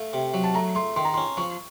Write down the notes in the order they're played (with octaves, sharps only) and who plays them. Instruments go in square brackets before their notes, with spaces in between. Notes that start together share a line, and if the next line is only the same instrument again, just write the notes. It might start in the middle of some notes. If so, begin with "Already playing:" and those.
Already playing: [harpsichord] A3 [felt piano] F5
[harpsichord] C3
F#3
[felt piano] A5
[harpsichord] A3 [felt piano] A#5
[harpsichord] A3 [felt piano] C6
[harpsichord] D#3 [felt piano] C6
[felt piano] A#5
C6
[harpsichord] C#4
[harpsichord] F3 [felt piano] C#6